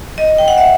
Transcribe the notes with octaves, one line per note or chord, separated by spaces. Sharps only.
D#5
G5
F#5
E5